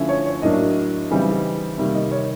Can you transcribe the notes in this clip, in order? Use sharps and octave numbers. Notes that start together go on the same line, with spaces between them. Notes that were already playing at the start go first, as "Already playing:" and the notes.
Already playing: D3 F3 A3 C#4 E4
C#5
C#5
A2 F#3 A#3 D4 D#5
C#3 E3 G3 C4 D#4
C3 D#3 G3 A#3 E5
D#5
C#5